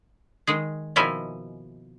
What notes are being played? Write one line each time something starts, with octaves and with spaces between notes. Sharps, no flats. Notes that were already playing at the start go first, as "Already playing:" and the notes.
D#3 G#3 G#4
B2 D#3 F3 A#3 E4 G#5